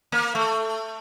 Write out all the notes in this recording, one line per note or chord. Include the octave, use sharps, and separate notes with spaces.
A#3
A3